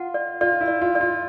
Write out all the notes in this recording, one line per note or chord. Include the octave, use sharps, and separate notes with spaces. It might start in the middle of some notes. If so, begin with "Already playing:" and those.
Already playing: F4 F#5
D5
F4 D5
E4
D5
F4
D5
F4